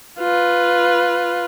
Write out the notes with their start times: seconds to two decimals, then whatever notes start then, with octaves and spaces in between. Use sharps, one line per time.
0.19 F4 B4